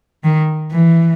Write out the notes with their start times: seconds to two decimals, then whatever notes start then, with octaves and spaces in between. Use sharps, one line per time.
0.24 D#3
0.72 E3